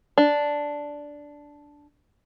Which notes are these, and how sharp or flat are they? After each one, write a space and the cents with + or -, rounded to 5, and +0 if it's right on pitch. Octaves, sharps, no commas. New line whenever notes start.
D4 -5